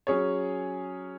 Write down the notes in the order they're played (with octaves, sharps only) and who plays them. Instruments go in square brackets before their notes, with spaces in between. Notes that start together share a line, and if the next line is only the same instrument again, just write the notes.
[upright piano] F#3 C#4 G#4 C#5